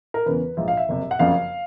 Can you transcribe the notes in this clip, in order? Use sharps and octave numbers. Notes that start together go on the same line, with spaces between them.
A#4
E2 C#3 E3 B4
A#1 G#2 F3 E5
F5
E5
F#1 F2 C3
F#5
F#1 F2 C#3 F3 F5